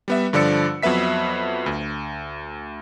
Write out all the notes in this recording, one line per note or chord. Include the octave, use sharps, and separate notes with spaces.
G3 B3 E5
G2 D3 F3 D5 E6 C#7
F2 F#3 B3 B4 E5 B6
D2